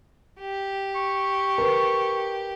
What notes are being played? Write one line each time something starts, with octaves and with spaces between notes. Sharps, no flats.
G4
C#6
A#4 B4